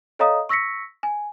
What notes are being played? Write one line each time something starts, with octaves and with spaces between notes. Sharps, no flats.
A4 C#5 D#5 F5 A#5 D#6
C#6 E6 A#6 B6 C#7
G#5